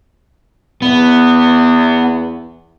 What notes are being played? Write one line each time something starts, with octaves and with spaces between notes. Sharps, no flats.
E2 B3